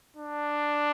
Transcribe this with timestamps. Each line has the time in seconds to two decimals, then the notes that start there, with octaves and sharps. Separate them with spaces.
0.17 D4